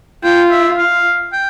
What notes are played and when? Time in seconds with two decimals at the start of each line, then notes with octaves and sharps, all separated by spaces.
0.24 F4 G5
0.51 E5
0.77 F5
1.32 G5